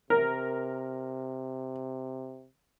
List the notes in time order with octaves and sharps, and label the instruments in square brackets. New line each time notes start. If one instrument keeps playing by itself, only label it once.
[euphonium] C3 [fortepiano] A#4